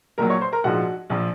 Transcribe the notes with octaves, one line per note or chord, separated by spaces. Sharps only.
A#1 A#2 F#3 A#4 A#5
C#5 C#6
C5 C6
A#4 A#5
A#1 G#2 F3 F#4 F#5
A#1 F3